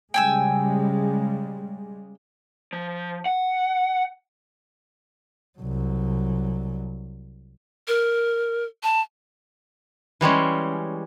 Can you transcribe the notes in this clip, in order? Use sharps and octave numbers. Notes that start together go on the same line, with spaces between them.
C#3 G3 G#3 G5 G#5 E6
F3
F#5
C2 F#3
A#4
A5
E3 G3 G#3 C#4